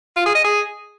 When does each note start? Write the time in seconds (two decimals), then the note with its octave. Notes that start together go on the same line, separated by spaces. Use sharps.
0.16 F4
0.26 G#4
0.35 D#5
0.44 G#4